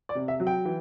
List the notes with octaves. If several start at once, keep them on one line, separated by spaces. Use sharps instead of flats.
D5
C3
E5
F#3
G5
E3